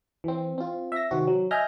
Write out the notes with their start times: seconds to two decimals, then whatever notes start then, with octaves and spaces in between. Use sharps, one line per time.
0.24 E3 C4
0.58 C4 F4
0.92 E5 A#6
1.11 C3 D#3 C4 F#4
1.27 F#3
1.51 D#5 E5 G#5 F6 G6 A#6